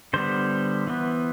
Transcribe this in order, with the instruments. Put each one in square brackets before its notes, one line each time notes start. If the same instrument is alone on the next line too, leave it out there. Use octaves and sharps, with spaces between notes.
[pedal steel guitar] D3 G3 B3 C5
E3 B3